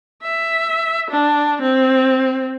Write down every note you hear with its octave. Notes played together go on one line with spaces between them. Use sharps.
E5
D4
C4